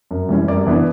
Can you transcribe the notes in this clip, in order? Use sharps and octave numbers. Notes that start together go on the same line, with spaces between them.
F#2
E3 G3 C#4
F#2 D5
E3 B3 D4